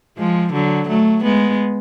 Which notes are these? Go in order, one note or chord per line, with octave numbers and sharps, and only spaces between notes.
F3 G#3
D3 F#3
F#3 A3
G#3 B3